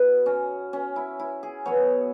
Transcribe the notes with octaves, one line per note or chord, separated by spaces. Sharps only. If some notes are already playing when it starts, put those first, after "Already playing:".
Already playing: B2 B3
C#4
C#4
E4
E4
G#4
B2 F#3 B3 C#5